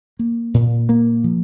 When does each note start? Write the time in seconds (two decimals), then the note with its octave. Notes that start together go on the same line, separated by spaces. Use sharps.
0.19 A#3
0.54 A#2
0.89 A#3
1.24 F3